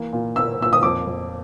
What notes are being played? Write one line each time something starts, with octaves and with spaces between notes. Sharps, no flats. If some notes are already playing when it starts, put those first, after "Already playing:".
Already playing: E3 A#3
A#2
A#3 E6
A#2 E6
D#6
F2 D6
F2